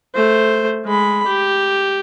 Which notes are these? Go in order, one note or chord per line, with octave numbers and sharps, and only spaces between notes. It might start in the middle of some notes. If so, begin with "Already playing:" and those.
A3 C5
G#3 B5
G4